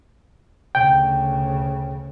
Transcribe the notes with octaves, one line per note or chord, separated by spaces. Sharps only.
D2 C#3 G5